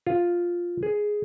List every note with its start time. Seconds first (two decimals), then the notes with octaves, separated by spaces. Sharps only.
0.07 F4
0.83 G#4